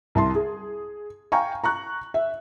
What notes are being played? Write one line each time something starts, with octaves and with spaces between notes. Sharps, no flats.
C2 A5 C6
G#4
F5 G5 G#5 A#5 C#6
A#5 C#6 F#6
E5